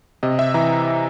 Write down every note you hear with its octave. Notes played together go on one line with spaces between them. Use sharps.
C3 D#5
E5
E3 A#5